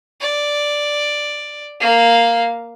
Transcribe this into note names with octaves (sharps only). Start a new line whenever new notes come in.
D5
A#3 F5